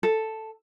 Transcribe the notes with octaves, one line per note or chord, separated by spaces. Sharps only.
A4